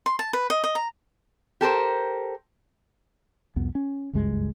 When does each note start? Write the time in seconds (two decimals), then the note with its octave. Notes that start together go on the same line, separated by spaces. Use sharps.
0.06 C6
0.19 A5
0.33 B4
0.50 D#5
0.64 D#5
0.75 A#5
1.61 G4 A4 A#4 C5
3.56 C2 F2 B3
3.75 C#4
4.13 F#1 C#2 G2 G#3